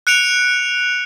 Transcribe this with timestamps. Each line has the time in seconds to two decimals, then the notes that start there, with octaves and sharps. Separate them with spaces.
0.07 F#6 C#7 D7 F7